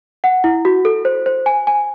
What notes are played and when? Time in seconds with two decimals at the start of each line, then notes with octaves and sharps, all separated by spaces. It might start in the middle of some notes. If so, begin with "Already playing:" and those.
0.24 F#5
0.44 E4
0.65 F#4
0.85 A4
1.05 C5
1.26 C5
1.46 G#5
1.67 G#5